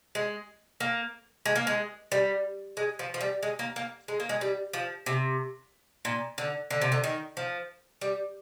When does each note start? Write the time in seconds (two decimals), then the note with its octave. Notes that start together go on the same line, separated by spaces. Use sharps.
0.15 G#3
0.80 A#3
1.46 G#3
1.56 A#3
1.67 G#3
2.12 G3
2.77 G#3
2.99 F3
3.14 F3
3.21 G3
3.43 G#3
3.59 A#3
3.76 A#3
4.08 G#3
4.20 A#3
4.29 G#3
4.41 G3
4.73 F3
5.06 C3
6.05 A#2
6.38 D3
6.71 D3
6.81 C3
6.92 D3
7.04 D#3
7.37 F3
8.01 G3